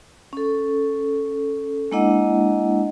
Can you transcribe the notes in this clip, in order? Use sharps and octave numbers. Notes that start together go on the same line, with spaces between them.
C#4 A4
G#3 A#3 D4 E4 D#5 F#5